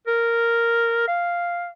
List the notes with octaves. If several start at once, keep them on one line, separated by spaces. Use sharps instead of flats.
A#4
F5